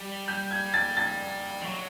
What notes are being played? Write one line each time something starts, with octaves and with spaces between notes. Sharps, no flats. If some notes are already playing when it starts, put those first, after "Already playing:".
Already playing: G3
G6
G#6
A6
A6
F3
F#3